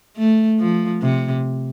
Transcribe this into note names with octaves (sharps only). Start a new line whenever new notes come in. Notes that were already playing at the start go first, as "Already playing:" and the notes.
A3
F3
C3